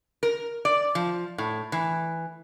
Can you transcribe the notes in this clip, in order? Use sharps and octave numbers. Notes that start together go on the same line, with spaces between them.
A#4
D5
F3
A2
E3